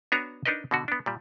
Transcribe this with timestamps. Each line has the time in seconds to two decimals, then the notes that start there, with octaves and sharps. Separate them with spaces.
0.12 B3 D4 F#4 C#5 G#5 A#5
0.46 D4 D#4 A#4 B4 D#5
0.71 B2 D3 F#4
0.88 B3 D4
1.06 A#2 G3